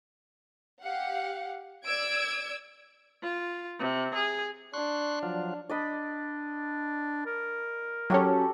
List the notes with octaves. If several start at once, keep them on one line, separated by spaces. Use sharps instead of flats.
G4 F5 F#5
D5 E6 G#6 D7
F4
C3
G#4
D4 C6 C#6 F#6
F3 F#3 F4
D4 D5 D#5 B5
A#4
F#3 C#4 F#4 G4 A4